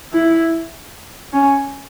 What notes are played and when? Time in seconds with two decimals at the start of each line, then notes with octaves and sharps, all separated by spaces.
0.13 E4
1.33 C#4